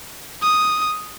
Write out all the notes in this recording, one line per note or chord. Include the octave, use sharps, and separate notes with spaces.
D#6